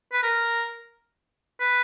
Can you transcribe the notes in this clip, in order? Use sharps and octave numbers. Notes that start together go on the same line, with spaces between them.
B4
A#4
B4